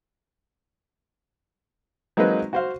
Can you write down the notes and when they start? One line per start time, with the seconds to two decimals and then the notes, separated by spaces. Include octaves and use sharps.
2.17 F#3 G#3 A#3 C4 D#4 B4
2.53 F#4 C5 F5